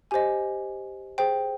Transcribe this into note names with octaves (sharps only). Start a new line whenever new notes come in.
G4 C5 D#5 G#5
G#4 C5 G5